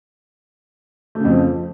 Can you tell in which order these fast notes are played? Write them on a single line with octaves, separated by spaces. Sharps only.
A3 C#3 F2 F3